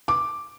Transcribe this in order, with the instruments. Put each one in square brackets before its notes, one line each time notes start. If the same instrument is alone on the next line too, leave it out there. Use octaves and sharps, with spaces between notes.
[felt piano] D6